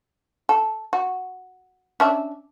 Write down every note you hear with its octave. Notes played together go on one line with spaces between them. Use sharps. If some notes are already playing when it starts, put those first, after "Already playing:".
A4
F#4
C#4 D4 E5